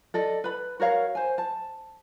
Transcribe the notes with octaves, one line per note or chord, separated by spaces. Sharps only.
A4 D5 D#5
B4 B5
F#4 A#4 C#5 F5
C5 G#5
A5